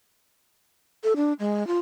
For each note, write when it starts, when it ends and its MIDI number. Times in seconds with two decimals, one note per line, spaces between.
1.04 1.13 69
1.16 1.33 62
1.39 1.66 56
1.67 1.79 65